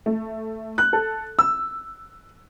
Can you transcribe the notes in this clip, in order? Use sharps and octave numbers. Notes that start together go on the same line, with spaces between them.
A3
F#6
A4
E6